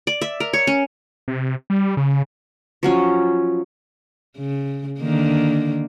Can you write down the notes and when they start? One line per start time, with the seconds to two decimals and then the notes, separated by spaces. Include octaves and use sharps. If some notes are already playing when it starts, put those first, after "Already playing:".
0.07 D5
0.22 E5
0.40 A#4
0.53 C#5
0.67 C#4
1.28 C3
1.70 G3
1.97 C#3
2.83 F3 F#3 C#4
4.38 C#3
5.01 D3 D#3 A#3